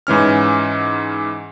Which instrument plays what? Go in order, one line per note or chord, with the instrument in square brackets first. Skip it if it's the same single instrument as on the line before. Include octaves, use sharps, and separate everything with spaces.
[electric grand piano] G#2 E3 C#4 F6